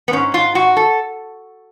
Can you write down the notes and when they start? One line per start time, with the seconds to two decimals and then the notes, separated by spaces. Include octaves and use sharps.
0.08 B3
0.13 G#2 C#4
0.34 G#2 F4
0.55 G#2 F#4
0.77 A4